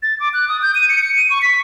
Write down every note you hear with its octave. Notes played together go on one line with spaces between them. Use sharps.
A6
D6
F#6
D#6
G6
D#7
C#7
C#7
D#7
C#6
B6